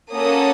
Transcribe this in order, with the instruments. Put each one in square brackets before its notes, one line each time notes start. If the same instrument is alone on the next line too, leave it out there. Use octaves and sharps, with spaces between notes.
[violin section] A#3 C#4 F#4 A4 D#6